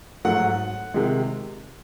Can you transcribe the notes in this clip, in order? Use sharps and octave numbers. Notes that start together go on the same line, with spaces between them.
G#2 F#3 A3 F#5
C3 D#3 G#3